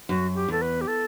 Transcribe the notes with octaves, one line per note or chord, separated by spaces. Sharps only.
F#2 F#4
G4
E2 A4
B4
G4
A4